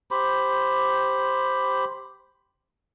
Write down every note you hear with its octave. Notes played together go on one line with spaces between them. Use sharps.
G4 C5 B5